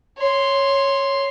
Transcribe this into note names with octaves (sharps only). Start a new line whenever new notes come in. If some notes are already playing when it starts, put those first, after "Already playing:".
C#5 C6